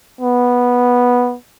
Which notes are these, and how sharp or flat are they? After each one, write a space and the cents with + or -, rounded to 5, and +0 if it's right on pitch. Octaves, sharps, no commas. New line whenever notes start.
B3 -10